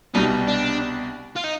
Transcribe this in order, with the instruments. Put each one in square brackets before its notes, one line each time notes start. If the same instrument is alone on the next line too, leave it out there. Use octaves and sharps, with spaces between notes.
[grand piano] C2 B2 G3 [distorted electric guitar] D#4
[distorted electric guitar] D4
F4
D#4